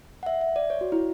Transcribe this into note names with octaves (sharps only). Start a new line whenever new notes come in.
F#5
E5
E5
D5
C#5
F#4
E4